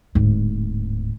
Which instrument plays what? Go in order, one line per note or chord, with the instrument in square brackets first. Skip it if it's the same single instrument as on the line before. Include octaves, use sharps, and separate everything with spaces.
[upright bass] D1 G#2